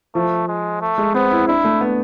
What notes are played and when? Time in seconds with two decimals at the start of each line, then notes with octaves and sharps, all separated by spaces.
0.15 F3 A3
0.48 G#3
0.81 A3
0.98 G#3
1.14 B3 C4
1.31 E4
1.48 D4 E4
1.64 A3
1.81 B3